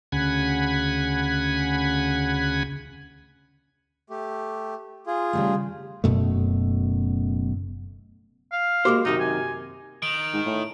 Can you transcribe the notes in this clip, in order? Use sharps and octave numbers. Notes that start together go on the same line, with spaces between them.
D2 C#3 F#5 G#5 B5 G#6
A3 G4
F4 G#4
C#3 G3 A3
F#1 F#2 B2 A3
F5
G#3 A#3 F#4 G4 C5 D6
F#2 C3 D#3 D#4
G#5
D#3 D7
G#2
A2